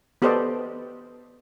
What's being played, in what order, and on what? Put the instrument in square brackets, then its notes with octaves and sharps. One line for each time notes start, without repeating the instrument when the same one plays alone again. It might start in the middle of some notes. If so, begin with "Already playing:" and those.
[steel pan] B3 G4 A4 C5 D5 D#5